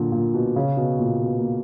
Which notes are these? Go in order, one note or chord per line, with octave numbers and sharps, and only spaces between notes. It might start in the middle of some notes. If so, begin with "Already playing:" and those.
Already playing: A#2 D3 F#3
A#2
B2
C#3
B2
A#2
B2
A#3